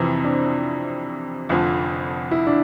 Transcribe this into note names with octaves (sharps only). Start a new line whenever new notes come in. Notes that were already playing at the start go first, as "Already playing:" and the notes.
Already playing: F2 C3 E3 C4
D4
F1 F2 D3 F3
E4
D4